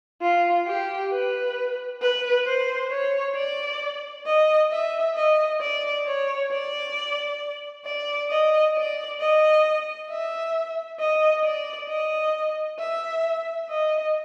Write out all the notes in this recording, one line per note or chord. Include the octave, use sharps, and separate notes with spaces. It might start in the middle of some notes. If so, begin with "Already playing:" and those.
F4
G4
B4
B4
C5
C#5
D5
D#5
E5
D#5
D5
C#5
D5
D5
D#5
D5
D#5
E5
D#5
D5
D#5
E5
D#5